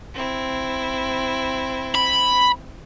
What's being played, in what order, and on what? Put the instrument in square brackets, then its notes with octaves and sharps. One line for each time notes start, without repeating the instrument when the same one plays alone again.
[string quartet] C4 E4
[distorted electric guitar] B5